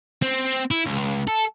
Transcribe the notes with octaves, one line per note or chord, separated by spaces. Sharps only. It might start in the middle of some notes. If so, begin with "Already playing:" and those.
C4
E4
C#2
A4